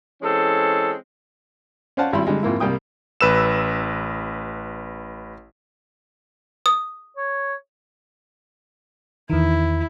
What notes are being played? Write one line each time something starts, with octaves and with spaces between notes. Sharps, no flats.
E3 G#3 C4 C#4 A4
C#4 C5 D5 F5 F#5 A5
G#1 G3 E4 B5 C6
D3 G3 G#3
F2 G#2 A#3 E4
C2 G3 A#3 G5 D#6
A1 B4 E6 E7
D#6
C#5
E2 D#3 E4